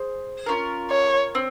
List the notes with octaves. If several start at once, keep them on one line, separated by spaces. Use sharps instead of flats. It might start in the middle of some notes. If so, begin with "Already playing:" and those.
Already playing: G#4 C5
C#4 F4 A#4
C#5
C4